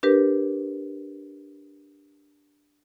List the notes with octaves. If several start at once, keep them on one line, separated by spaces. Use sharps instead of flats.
D4 G4 A#4 B4